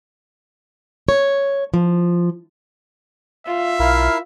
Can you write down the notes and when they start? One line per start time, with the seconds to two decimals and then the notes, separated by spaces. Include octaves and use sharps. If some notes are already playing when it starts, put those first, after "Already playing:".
1.09 C#5
1.74 F3
3.47 F4 E5
3.79 B1 E4 A#4 F5